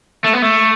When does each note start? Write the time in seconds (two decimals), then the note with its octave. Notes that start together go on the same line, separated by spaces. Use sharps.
0.24 A3
0.33 B3
0.42 A3